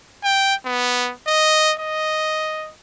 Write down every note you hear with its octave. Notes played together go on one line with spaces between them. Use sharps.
G5
B3
D#5
D#5